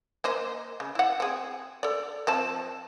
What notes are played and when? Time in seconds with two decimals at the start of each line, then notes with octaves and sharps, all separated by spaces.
0.24 A#3 C5 D#5
0.80 C#3
0.95 E4 F#5
1.20 C4 G#4
1.83 A4 D5
2.27 F3 C4 A5